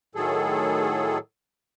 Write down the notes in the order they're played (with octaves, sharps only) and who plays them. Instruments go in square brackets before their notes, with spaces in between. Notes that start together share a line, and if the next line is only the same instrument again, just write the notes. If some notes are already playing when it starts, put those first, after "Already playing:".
[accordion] A2 D#3 F#3 G#4 A4